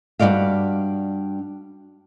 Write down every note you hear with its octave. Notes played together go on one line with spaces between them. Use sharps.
G2 F3 F#4 D5 F5